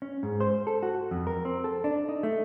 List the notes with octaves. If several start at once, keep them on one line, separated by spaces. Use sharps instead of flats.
C#4
G#2
C5
A4
F#4
F2
A#4
C4
A4
D4
D#4
A3